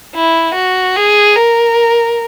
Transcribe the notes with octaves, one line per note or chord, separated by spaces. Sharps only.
E4
F#4
G#4
A#4